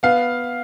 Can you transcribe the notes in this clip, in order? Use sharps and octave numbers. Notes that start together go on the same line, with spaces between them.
B3 F5